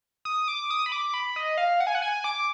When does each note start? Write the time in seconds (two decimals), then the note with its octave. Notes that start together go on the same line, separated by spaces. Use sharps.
0.25 D#6
0.48 D6
0.70 D#6
0.86 B5
0.92 D6
1.14 B5
1.36 D#5
1.58 F5
1.80 F#5
1.87 G#5
1.95 F#5
2.02 G#5
2.24 D6